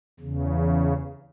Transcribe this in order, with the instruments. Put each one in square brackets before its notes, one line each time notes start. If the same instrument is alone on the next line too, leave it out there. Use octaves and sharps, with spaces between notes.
[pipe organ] E2 C#3